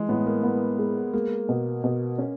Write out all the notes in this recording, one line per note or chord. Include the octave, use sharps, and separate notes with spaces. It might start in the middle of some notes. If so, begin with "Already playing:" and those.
Already playing: E3 G#3
A2 B3
A#3
B3
G#3
G#3 A#3
B2
B2
C#4